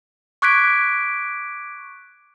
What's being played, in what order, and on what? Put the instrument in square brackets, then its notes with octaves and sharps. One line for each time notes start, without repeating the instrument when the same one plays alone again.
[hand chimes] C#6 D6 F#6 G#6 B6 D7